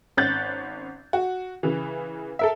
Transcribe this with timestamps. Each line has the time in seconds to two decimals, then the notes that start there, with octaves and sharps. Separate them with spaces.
0.17 G#1 C#4 F#6 G6 A6
1.13 F#4
1.63 C#3 E3
2.39 A4 A#4 E5